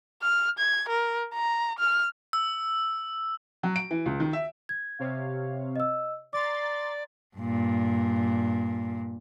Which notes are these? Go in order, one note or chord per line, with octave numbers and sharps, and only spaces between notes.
F6
G#6
A#4
A#5
F6
E6
F#3
D7
E3
C#2
D#3
E5
G#6
C3 C#5 F5
D#5 E6
D5 A#5 C6 D6 A6
G2 A#2